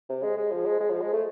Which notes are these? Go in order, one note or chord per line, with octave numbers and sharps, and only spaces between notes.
C3
G#3
G#3
F3
G#3
G#3
F3
G#3
A3